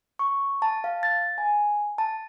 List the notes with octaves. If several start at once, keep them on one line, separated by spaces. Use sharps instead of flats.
C#6
A5
F5
A6
G#5
A5